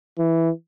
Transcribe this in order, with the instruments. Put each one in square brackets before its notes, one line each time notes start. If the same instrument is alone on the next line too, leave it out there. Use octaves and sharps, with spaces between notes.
[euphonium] E3